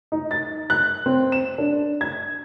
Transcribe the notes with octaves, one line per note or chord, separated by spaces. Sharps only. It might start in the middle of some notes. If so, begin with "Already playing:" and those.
D#4
A6
F#6
C4
E7
D4
G#6